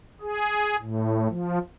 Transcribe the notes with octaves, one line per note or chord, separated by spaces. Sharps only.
G#4
A2
F3